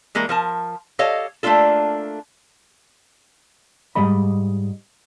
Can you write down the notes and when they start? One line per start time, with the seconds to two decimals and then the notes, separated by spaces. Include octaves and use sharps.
0.15 E3 G#3 A#3 A#4
0.29 F3 A#4 A5
0.99 G4 A4 C#5 D#5 F5
1.43 A3 A#3 D4 F4 A4
3.95 G#2 G3 G#3 D#5 B5